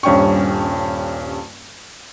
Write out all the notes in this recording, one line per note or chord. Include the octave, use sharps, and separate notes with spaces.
D#1 G2 C#4 G5 C#6